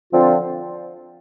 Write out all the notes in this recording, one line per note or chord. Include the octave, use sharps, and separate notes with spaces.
D3 F3 C4 F4